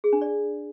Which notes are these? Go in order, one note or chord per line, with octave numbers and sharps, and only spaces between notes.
G#4
D4
D5